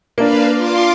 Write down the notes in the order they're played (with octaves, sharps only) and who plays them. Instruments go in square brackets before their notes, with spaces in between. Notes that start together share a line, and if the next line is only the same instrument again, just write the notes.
[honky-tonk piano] A#3 D4 [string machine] B4 F5
[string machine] F4 C6 D6